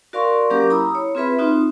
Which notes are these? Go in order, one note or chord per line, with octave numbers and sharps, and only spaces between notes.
F#4 A#4 D5 F5 C6 C#6
F#3 A#3 C#4 G4 A#4 D6
E4 A#5 B5 D#6 E6
C#5
C4 F4 G#4 B4 E5 B5
C4 D#4 F4 F#4